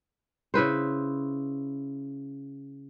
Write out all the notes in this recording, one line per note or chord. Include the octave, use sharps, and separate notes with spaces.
C#3 E4 B4 C5